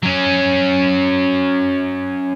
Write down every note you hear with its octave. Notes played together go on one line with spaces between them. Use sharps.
F#3 C#4